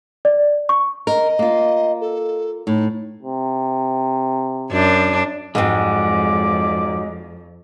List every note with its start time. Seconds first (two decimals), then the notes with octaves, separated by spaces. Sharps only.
0.25 D5
0.69 C#6
1.07 A#4 D#5
1.39 A#3 F4
2.01 A4
2.67 A2 D#4
3.23 C3
4.72 F#2 D4
5.55 F2 G#2 F#3 G#3 C4 D5